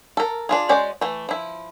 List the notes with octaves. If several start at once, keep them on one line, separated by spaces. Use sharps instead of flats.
A4 A#4
D4 F4 G#4
G#3 C#4 F#4 C5 D5
E3 A3
F3 E4